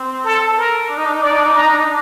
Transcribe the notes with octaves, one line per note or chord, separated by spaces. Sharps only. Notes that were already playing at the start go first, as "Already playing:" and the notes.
Already playing: C4
A4
A#4
D4
D#4
D4
D#4
D4 D5
D#4
D4
D#4
D4 A#5
D#4
D4
D#4
D4